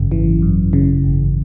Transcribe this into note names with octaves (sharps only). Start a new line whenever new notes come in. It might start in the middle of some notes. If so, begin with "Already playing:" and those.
Already playing: G#1 F#2 C#3
E3
F#2
C#3
G#1